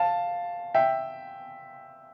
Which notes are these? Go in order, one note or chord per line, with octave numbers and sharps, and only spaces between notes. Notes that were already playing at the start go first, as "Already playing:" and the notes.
Already playing: F5 A5
E5 G5